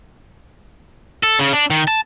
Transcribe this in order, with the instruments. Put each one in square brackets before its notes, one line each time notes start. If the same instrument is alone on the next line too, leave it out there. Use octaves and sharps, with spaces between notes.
[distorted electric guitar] A4
C#3
D4
D#3
A5